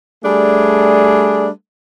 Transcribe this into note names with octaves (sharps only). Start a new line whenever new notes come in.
G3 A3 D4 G#4